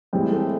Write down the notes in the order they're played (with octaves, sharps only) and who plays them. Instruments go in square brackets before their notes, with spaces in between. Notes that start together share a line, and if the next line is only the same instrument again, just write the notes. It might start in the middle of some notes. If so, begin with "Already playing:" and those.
[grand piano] A2 E3 G#3 C4 [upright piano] G3
[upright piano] A3